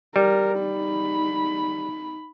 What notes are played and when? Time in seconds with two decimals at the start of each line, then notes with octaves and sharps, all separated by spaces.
0.16 G3 A#4
0.60 D#4 B5